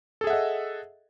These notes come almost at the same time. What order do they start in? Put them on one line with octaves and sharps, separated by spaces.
A4 G#4 E5 F#5 D#5